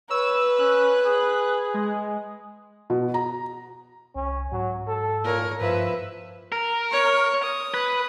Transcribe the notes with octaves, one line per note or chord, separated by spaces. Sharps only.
B4 C#5 E6
C#4 F#6
G#4
G#3
B2
A#5
C2 C#4
G#2 F#3
A4
A#2 A#4 C#5
G2 F3 B4 E5
A#4
C#5
D#6
B4